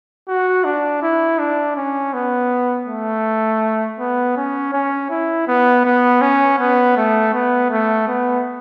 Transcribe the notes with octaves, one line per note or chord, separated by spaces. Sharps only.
F#4
D4
E4
D4
C#4
B3
A3
B3
C#4
C#4
E4
B3
B3
C#4
B3
A3
B3
A3
B3